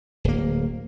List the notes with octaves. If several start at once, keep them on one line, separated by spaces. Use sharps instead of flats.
D1 A#3